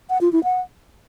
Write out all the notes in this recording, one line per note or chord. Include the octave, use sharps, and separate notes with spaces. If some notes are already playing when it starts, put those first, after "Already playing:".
F#5
F4
E4
F#5